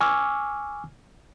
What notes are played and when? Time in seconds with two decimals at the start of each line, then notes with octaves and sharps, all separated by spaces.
0.01 G#5 C#6 D6 E6 F6